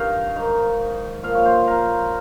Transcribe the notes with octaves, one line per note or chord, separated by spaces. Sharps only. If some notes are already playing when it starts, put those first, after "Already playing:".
Already playing: G2 D#3 D#4 C#5 F5 G5
G#2 D#3
A#2 F3 F5
C#5
C5
A#4